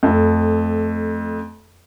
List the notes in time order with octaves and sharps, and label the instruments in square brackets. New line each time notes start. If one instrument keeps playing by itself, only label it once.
[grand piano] F2 A3